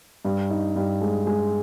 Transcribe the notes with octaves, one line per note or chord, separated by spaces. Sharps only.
G2
D#4
G2
G#3
G#3